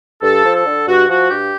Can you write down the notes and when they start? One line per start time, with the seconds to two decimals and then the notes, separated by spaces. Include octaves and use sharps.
0.23 G2 A4
0.44 F3
0.55 A4
0.66 D3
0.87 G2 F#4
1.08 F3 F#4
1.29 G2 G4